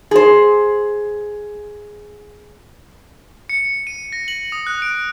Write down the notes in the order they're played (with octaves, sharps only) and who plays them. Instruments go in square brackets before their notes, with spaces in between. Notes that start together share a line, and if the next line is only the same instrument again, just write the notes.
[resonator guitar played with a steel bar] G#4 C5
[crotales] C#7
D#7
A#6
F#7
D#6
F#6
D7